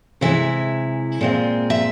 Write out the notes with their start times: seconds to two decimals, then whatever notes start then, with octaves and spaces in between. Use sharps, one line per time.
0.21 C3 E3 G#3 E4 E5
1.21 A#2 G#3 C4 F4
1.70 E5